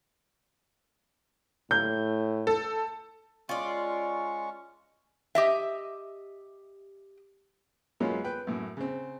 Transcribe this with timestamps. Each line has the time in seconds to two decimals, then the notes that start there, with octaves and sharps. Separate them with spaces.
1.71 A2 G6
2.47 A4
3.49 G#3 C#4 F4 D5 C#6
5.35 G4 D#5 E5
8.00 F#2 G#3 A#3 B3 C#4 F4
8.24 B4 G5
8.47 F#2 A2
8.77 C#3 C4